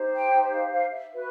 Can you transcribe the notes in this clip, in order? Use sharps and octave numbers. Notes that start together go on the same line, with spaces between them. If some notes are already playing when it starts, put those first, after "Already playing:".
Already playing: D#4 G4 C5
G5
F5
F5
E5
F#4 B4